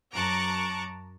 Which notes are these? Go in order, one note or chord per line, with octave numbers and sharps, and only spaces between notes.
F#2 A5 A#5 C#6 D6 F#6